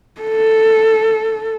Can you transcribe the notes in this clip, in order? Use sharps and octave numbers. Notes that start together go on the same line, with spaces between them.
A4